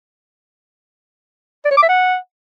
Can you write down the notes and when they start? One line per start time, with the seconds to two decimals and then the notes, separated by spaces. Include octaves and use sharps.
1.65 D5
1.71 C#5
1.77 D6
1.83 E5
1.89 F#5